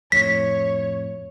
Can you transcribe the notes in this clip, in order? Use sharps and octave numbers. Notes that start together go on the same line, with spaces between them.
F2 A2 C#5 B6